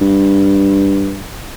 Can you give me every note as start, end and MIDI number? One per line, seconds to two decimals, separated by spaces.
0.01 1.23 43